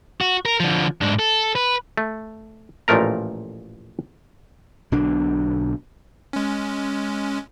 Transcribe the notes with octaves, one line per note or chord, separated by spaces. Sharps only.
F#4
A#4
D3 F3
G#2 D4
A4
B4
A3
A1 A#2 F3 A3 A#4 A#5
B1 B2 D3 D4
G#3 C#4